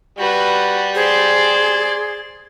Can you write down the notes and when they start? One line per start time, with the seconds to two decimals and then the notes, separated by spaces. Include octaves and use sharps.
0.19 G3 F#4 B4
0.95 G#4 C5 D5